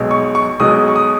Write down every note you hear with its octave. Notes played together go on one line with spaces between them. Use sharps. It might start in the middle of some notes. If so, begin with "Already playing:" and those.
Already playing: B1 B2 G#3
C#6
C#6
B1 B2 G#3 D#6
C#6
D#6